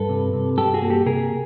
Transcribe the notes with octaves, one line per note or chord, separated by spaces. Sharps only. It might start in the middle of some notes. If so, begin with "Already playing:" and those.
Already playing: G2 A4 B4
C3
C3
G2 G4 A4
F#4 G#4
A#3
G4 A4
C3 G#4 A#4